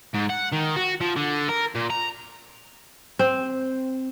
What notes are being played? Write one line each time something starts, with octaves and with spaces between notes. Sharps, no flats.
G#2
F#5
D#3
F#4
F3
D3
A#4
A#2
A#5
C4